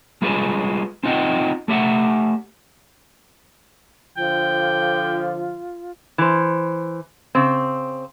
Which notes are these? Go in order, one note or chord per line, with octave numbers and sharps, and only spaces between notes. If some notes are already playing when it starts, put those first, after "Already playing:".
G3 G#3 F4 G#4 B4
C4 D#4 F4 D#5 F#5 G5
A3 G4 E5 F#5
D3 F3 F4 G5
E3 C5
C#3 C4